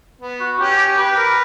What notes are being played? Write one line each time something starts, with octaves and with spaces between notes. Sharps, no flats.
B3
F#4
C#4 G4
G4
G4 B4
A#4